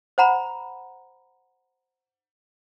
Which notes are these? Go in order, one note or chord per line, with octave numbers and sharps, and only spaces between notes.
C5 F#5 A#5 B5